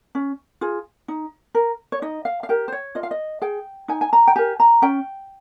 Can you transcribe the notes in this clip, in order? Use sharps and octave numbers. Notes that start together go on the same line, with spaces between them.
C#4
F4 G#4
D#4
A#4
C#5
D#4 D#5
F5
F5
G4 A#4 G5
C5
C#5
F4 D#5
F5
D#5
G#4 G5
D#4 G#5
G#5
A#5
G5
G4 A#4 G#5
A#5
C#4 G5